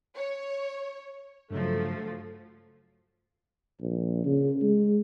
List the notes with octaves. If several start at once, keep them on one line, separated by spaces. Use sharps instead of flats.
C#5
G2 C#3 F3 F#3 A3
A#1
C#3
G#3